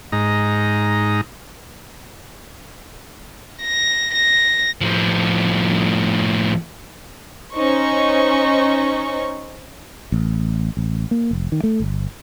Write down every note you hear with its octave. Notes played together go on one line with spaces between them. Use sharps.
G#2 D#4 A#5
A#6
A#6
A2 F3
C#4 D#4 C5 C#6
A1
A1
A#3
F1
D#3
A3
G1